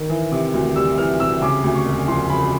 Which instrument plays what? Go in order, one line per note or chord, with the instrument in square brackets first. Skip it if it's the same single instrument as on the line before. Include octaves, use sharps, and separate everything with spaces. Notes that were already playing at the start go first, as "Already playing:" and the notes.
Already playing: [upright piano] D#3
E3
C3
D2
G3 E6
E3 F6
C3 E6
C#3 D6
D2
C#6
E1
F3 C6
C#3 B5